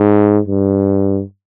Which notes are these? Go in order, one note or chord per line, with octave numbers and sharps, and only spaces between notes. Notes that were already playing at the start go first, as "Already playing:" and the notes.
Already playing: G#2
G2